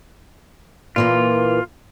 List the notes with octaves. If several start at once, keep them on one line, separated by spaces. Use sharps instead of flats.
A#2 E3 A#3 F4